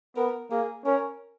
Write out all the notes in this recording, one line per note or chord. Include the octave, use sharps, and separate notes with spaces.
B3 A#4
A#3 G#4
C#4 A#4